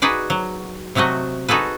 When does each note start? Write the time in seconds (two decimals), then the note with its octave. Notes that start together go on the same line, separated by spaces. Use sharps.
0.02 D#4 F#4 G#4 B4 D5
0.30 F#3
0.95 C3 F#3 A3 F#4 D#5
1.49 D#4 F#4 G#4 A4 B4